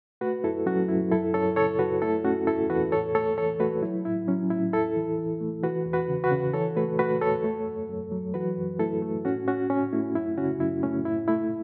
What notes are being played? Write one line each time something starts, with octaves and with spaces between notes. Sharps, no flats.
A3 F#4 B4
F#2 E4 A4
F#3 C#4 F#4
F#2 E4
F#2 E4 A4
F#2 A4 C#5
C#3 A4 C#5
F#2 F#4 B4
A3 E4 A4
A3 C#4 F#4
E2 E4 A4
E2 F#4 B4
A2 A4 C#5
A3 A4 C#5
E3 A4 C#5
A3 F#4 B4
F#3 E4
A2 E4
F#3 C#4
A2 E4
E2 E4 A4
E3
E3
A3
E3 F#4 B4
E2
F#4 B4
C#3
F#4 B4
C#3
E3 A4 C#5
A3 F#4 B4
A3 F#4 B4
E2 A4 C#5
A3
F#2
F#2
F#3
E3 F#4 B4
F#2
A3 E4 A4
A3
A2 C#4 F#4
A2 C#4 F#4
A2 C#4
A3 E4
F#2 E4
C#3 C#4 F#4
F#2 E4
A3 C#4
A2 E4
A3 E4